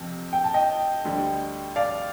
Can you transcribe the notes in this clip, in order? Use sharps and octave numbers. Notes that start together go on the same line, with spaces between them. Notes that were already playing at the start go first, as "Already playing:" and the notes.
Already playing: F2 C3 F3
G5
A5
D#5 G5
D2 D3 G3
D5 F5